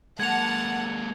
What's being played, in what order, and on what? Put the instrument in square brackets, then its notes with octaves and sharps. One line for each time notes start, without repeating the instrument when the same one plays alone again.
[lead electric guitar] G#3 A#3 [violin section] F#5 A5 [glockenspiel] G#6 F7